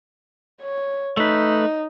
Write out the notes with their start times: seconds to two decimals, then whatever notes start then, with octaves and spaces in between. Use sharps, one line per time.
0.61 C#5
1.17 A3 D#4 B4